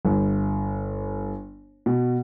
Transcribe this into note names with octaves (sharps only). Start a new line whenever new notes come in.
G1
B2